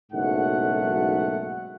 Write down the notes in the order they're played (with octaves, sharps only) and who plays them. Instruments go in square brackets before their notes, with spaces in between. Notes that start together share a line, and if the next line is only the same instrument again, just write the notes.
[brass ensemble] F#1 B1 G#2 A3 F#5